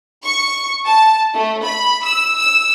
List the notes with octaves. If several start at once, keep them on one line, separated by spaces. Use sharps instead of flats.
C#6
A5
A3
B5
E6
E6